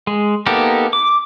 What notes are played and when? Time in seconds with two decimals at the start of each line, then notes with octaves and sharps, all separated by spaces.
0.07 G#3
0.46 A#3 B3 D#4 G4 A4
0.93 D6